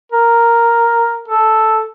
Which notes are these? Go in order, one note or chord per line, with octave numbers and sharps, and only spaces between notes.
A#4
A4